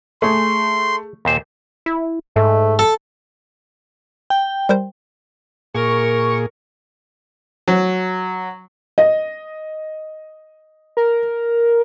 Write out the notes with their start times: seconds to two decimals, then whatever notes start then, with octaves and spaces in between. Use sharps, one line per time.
0.22 A3 G#4 C6
1.25 D#2 A#2 C5
1.86 E4
2.36 G#2 A3
2.79 A4
4.30 G5
4.69 G3 A#4 C5
5.74 A#2 G#4 A#4 C#6
7.68 F#3
8.98 D#5
10.97 A#4